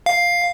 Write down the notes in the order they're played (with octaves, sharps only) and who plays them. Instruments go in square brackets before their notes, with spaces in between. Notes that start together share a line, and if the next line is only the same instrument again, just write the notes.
[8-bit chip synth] F5